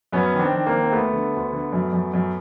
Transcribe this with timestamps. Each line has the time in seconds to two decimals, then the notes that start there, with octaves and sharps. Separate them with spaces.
0.12 F#2 B3 C#4
0.34 D#3
0.39 C4 D4
0.52 D#3
0.66 A#3 C4
0.72 D#3
0.82 C4
0.92 D2 A3 B3
1.13 D3
1.34 D2
1.52 D3
1.72 F#2
1.93 F#2
2.13 F#2